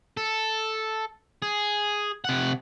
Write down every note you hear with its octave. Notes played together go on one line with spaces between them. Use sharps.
A4
G#4
C3 F#5